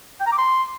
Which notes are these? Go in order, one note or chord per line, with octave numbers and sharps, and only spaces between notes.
G5
A#5
D6
C6